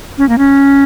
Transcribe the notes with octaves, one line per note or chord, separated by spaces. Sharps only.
C#4
A#3
C#4